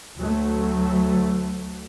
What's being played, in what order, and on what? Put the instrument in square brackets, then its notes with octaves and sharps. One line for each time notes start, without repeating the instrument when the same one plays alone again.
[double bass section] D2 F#3 A3